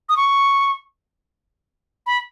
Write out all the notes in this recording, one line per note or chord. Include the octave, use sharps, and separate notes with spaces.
D#6
C#6
B5